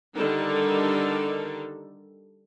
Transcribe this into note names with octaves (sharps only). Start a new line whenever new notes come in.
D3 D#3 G3 D#4 A4 A#4